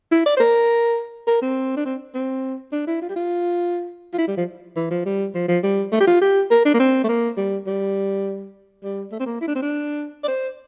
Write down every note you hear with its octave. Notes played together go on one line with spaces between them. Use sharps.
E4
D5
C5
A#4
A#4
C4
D4
C4
C4
D4
E4
F4
G4
F4
F4
E4
G3
F3
E3
F3
G3
F3
F3
G3
A3
G4
F4
G4
A#4
D4
A#3
C4
A3
A#3
G3
G3
G3
A3
C4
A#3
E4
D4
C4
D4
D5
C5